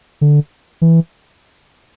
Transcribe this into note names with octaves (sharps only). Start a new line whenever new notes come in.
D3
E3